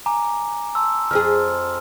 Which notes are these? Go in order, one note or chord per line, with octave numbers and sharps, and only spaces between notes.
G#5 A#5 D6
A5 C6 E6
F2 F3 G#4 F6